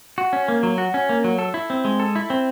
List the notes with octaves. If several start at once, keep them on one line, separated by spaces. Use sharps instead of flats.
F#4
C#4
A#3
F#3
F#4
C#4
A#3
F#3
A4
E4
C4
G#3
A4
E4
C4